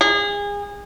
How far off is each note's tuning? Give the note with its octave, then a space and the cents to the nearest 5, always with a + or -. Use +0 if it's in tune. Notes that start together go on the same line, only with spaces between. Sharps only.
G#4 -30